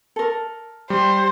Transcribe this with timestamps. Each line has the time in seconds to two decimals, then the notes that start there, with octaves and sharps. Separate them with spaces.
0.16 A4 A#4
0.90 G3 C5